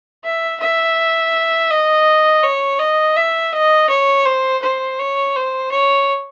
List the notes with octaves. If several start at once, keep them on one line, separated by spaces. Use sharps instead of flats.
E5
E5
D#5
C#5
D#5
E5
D#5
C#5
C5
C5
C#5
C5
C#5